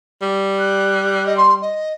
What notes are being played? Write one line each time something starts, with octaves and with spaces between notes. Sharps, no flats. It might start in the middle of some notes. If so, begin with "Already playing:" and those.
G3
F#6
D#5
C6
D#5